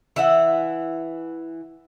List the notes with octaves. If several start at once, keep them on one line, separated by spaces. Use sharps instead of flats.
E3 E5 F#5